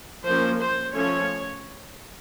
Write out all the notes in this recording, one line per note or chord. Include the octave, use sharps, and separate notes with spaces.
F3 A#3 C#4 C5
C5
F3 A3 C#4 C#5